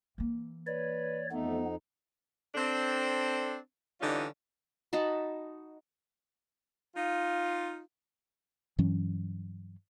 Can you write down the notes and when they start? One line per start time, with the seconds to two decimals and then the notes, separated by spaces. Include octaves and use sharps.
0.18 E3 A#3
0.67 B4 C#5 D5
1.31 F2 A3 B3 D#4
2.55 C4 D4 A4
4.01 D3 E3 G3 C#4 D#4 F4
4.93 D#4 F#4 A5 B5
6.96 D#4 F4
8.78 G2 E3 F#3 C#4